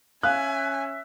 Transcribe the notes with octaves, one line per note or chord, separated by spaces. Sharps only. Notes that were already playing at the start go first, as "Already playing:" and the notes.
C#4 E5 F5 G#5 F#6